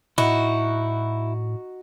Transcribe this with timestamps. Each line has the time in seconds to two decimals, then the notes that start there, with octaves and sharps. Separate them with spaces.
0.18 A2 D#4 E4 F#4